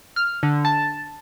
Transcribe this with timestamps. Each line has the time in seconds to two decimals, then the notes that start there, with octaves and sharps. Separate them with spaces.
0.16 F6
0.43 D3
0.65 A5